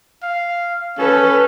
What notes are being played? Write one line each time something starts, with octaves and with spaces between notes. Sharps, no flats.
F5
C#4 A4 B4